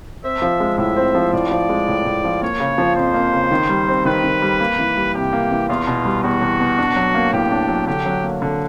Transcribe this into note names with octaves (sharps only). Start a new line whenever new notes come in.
C4 E5
F3
G#3
A2 E5
C4
F3
A2 D5
F3
G#3
A2
A2
F3
A#3 C#5
C#3
F3
F2 C5
A#3
C#3
D#3
G3
C4
D#3 B4
D#3
G3
A#3
E3
G3
C3 G4
A#3
E3
E2 F4
B2
G3
E2 F#4
E2
B2
D4
F#3
A#3
A2 G4
D4
F#3
D3 G4
F#3
A#3
D3